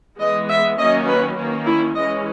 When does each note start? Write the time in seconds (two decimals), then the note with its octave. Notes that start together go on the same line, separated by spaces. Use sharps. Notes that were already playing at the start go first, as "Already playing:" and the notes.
0.19 E3 G#3 B3 D#5
0.48 E5
0.78 D#3 F#3 A#3 C#4 D#5
1.07 B4
1.37 D#3 A#3 C#4
1.66 E4
1.96 E3 G#3 C#4 D#5